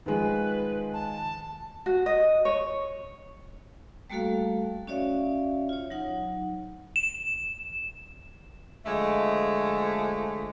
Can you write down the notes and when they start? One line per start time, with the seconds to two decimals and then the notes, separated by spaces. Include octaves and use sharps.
0.06 D#3 F3 G#3 B4
0.93 A5
1.86 F#4
2.06 D#5
2.45 C#5
4.10 G3 A3 A#3 F#4 A4 F5
4.87 C#4 F#4 C#5 D5 E5 F5
5.69 F4 C#5
5.90 F#3 D#4 F#5
6.96 E7
8.86 D3 F3 G#3 A3